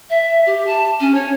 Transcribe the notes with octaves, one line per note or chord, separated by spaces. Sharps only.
E5
G4
A5
C#4
C#5